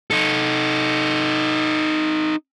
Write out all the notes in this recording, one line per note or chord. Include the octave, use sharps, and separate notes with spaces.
D#4 A4